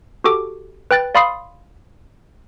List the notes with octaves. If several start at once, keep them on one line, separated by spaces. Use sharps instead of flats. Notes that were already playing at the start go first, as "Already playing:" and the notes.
F#4 G4 A4 D6
B4 G5 F#6 A6
D5 F5 B5 C6 D#6 C7